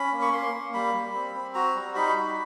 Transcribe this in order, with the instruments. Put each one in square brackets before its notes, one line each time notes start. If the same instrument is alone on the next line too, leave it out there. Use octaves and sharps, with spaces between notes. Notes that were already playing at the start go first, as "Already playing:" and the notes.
Already playing: [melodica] C#4 B5
A#3
C#6
A#3 C6
A#3
G3 B5
G3
C4
C4
F#4 A#5
G3
D#4 B5
F#4